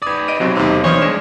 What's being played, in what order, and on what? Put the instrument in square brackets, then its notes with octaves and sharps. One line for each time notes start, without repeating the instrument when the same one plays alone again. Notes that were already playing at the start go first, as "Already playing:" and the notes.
[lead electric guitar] B4 D5 [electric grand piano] D#6 G#6
[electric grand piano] D#5 D7 D#7
[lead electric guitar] B1 [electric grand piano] C3 F#3 C4
[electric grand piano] D#2 D#4 [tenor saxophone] C3
[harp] E3 D4 C6 [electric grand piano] C5 D#6 F6 [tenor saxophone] C#5
[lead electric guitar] G2 G#3 [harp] D4 [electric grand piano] E7